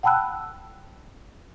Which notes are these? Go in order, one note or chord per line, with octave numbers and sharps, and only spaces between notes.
F#5 G5 A5 B5 E6 F#6